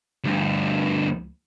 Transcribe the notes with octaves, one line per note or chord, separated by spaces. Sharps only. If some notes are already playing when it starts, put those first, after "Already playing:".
D2 G2